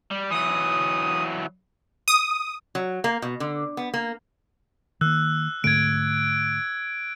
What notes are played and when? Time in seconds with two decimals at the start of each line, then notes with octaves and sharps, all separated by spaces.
0.11 G3
0.31 E3 F#3 D#6
2.08 D#6
2.75 F#3
3.04 A#3
3.22 B2
3.40 D3
3.77 B3
3.94 A#3
5.01 D#3 A#3 E6 F#6
5.64 G#2 D3 A3 G#6 D7